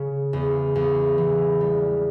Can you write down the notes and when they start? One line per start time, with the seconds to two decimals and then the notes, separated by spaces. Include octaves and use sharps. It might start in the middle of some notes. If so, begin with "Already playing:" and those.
Already playing: C#3
0.33 E2
0.75 E2
1.18 E3
1.61 G3